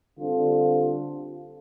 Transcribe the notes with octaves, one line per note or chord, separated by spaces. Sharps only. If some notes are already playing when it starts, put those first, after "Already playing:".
D3 G3 C4 F4 A4